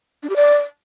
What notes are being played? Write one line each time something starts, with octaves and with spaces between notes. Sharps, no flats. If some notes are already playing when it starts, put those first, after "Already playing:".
D4
G4
D5